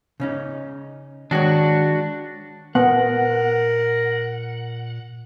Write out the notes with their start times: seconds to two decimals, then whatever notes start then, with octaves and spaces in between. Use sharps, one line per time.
0.20 C#3 C#4 D#4
1.31 D#3 G#3 D4 F#4 C#5
2.75 A#2 B3 A#4 F#5